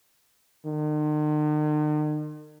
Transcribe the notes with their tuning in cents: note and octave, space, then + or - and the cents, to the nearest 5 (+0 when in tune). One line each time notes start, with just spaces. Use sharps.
D#3 -45